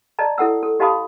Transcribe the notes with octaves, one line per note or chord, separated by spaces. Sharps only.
D5 D#5 A5 A#5
E4 A4 F#5 E6
A4
G4 D#5 F5 A5 B5 D#6